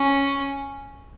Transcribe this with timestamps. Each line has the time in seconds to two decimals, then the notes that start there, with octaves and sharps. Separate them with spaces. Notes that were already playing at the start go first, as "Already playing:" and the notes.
Already playing: C#4